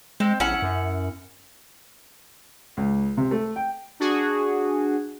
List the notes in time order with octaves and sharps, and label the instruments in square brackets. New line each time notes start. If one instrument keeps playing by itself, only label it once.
[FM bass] G#3 [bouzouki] C4
[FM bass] A#1 [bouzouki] C#4 E4 F#5
[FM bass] F#2
[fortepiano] C#2
C3
A3
G5
[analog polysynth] D4 F#4 G#4